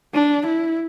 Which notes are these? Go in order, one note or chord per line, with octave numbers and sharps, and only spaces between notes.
D4
E4